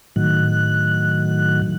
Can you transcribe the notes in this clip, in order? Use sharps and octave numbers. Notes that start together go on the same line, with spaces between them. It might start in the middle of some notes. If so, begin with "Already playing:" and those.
A2 D#3 F#3 F#6